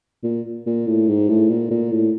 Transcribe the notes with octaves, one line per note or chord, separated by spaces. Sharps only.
A#2
A#2
A2
G#2
A2
A#2
A#2
A2